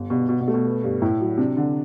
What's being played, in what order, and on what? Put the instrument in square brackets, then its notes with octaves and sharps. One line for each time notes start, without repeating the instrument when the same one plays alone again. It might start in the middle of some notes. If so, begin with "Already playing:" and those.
Already playing: [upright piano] G1
[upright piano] G2 [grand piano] B2
[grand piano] B2 [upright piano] F#4
[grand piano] B2
[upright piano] A3
[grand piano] B2
[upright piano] B3
G2
[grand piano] A2 [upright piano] E4
[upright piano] F#3
[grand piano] C3 [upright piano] D4
[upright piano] D3